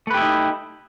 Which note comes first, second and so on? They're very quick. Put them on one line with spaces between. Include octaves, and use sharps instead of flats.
A3 B4 G4 E4 D#4